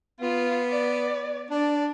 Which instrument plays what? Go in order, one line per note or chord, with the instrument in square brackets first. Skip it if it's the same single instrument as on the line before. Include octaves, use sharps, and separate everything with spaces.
[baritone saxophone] B3 [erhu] F4
[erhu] D5
[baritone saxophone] D4 [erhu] D5